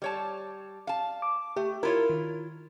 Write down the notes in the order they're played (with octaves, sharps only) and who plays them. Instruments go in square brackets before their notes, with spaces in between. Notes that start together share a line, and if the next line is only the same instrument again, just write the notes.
[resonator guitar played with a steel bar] G3 C#5 A5
F5 A5
[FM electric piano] D6
[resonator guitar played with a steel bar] A3 [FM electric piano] G4
[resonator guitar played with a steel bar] E4 F4 C#5 [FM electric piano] A#4
[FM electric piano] D#3